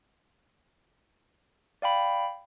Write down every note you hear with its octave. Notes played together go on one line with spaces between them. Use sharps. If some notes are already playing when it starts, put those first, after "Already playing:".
D5 F5 G5 B5